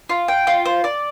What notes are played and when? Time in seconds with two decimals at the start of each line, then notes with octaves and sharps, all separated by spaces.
0.09 F4
0.28 G5
0.47 F4
0.66 C5
0.84 D5